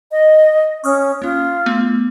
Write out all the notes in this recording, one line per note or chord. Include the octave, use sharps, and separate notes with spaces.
D#5
C#4 C#6 D#6 F6
A#3 C#4 F4
A3 B3